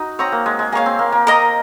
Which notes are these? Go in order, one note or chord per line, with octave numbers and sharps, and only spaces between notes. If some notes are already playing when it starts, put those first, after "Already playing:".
Already playing: D#4 F#4
C4 C#5 F#5 A#5 D#6
A#3
G#3
G#3
A#3 G#4 C#5 F5
C4
A#3
A#3
A#4 D#5 A#5 D#6